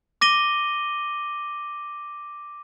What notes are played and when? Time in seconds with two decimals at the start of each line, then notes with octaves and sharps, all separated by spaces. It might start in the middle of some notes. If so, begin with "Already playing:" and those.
0.21 D6 A#6 D#7 G7